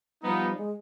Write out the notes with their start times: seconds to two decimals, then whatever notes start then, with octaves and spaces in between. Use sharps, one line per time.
0.23 F3 G3 B3 D#4
0.57 G#3